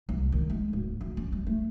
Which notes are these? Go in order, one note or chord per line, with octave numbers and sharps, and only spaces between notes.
C2
D#3
G#3
D1
D2
C#4
G3
A3